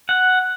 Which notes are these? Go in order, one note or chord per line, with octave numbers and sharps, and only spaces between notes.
F#5